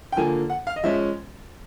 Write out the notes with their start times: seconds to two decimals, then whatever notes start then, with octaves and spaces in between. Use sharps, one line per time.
0.12 G5
0.17 D3 F3 A#3 G#5
0.50 F#5
0.67 F5
0.76 D#5
0.84 F3 G#3 C#4 E5